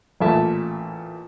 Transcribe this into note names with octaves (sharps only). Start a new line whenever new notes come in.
A1 A#2 A3 E5 A5